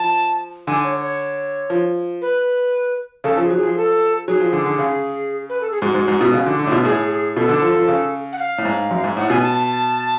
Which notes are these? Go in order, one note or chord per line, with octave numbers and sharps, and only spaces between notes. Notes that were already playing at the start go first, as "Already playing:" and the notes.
Already playing: F3 A5
D3 G#5
C#5
C#5
F3
B4
C#3 A4
F3 G#4
F#3
G#4
F3
A4
F#3 G#4
F3
D3
D3
C#3
B4
A4
G#4
G#2 F#4
G#2
G#2
B2
C#3
D3
D3
A2
B2
A2 G#4
G#4
B2 A4
D3
F3
F3
C#3
F#5
F5
A2
G#2
F#2
G#2
A2 F#5
B2 G#5
A5